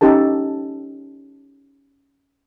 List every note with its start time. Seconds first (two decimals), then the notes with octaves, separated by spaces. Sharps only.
0.01 C#4 D#4 G4 A4 A5